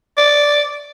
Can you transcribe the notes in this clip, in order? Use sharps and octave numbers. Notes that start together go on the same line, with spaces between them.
D5